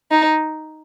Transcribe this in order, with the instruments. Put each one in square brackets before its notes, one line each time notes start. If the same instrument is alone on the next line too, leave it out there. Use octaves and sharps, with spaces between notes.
[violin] D#4